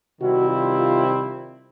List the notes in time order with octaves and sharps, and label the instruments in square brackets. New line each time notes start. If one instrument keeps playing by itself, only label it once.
[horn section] C3 D#3 G3 C4 E4 [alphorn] F#4
[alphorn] F4
F4